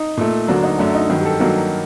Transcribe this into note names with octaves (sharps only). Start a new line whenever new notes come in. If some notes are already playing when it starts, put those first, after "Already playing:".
Already playing: D#4
A#2 A3
D2 D3 F#3 A#3 D4
D#4
F#2 F#3 A3 D4
D#4
G2 D#3 F#3
G4
A4
G2 D#3 F#3 A#3 A4